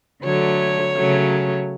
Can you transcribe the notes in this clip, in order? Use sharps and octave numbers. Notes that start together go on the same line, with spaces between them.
D3 F#3 A3 C#5
C#3 F#3 A3